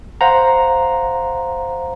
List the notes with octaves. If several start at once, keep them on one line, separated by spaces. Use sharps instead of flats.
C5 F5 F#5 A#5